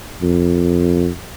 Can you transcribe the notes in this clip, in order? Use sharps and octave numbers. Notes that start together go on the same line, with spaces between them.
F2